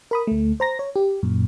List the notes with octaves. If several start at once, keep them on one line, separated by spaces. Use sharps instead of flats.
A#4 B5 D#6
D2 A3
C5 A#5 A#6
C#5
G4
F#2 A#2